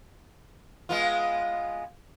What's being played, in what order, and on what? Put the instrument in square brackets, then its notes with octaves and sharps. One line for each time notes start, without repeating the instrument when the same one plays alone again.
[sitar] G#3 B3 F4